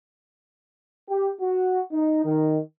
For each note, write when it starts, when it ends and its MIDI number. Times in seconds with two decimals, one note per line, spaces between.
1.09 1.30 67
1.41 1.80 66
1.93 2.25 63
2.25 2.59 51